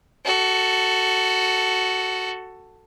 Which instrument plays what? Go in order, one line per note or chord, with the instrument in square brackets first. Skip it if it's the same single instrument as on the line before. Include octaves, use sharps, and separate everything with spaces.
[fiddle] F#4 A4